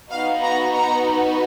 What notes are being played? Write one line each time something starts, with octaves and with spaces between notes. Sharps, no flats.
B3 D#4 F#4 F5
A#5
A#5